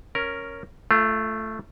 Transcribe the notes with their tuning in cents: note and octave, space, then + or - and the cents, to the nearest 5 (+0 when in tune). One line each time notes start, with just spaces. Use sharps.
C#4 +0 A#4 +0
A3 +0 F4 -30